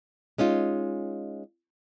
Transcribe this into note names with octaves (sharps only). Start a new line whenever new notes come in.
G#3 C#4 D#4 F4